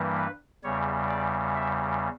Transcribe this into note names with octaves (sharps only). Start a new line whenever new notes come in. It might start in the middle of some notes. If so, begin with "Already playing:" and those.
Already playing: G2 E3 G3 A#3
B4
E2 C#3 G3 C#5
D5
E5